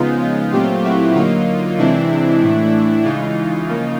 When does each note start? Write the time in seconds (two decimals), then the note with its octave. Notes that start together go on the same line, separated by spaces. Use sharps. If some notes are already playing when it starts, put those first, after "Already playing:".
Already playing: C#3 F3 G#3 B3 D#4 F4
0.20 D#4 F4
0.52 A#2 F#3 A3 C4 F4 G4
0.84 E4 F#4
1.15 D3 F#3 A#3 D#4 F4
1.79 C3 E3 G#3 C4 D4 E4
2.42 A2 E3 A3
3.05 C#3 E3 G#3 D#4 F4
3.68 C#3 F3 A#3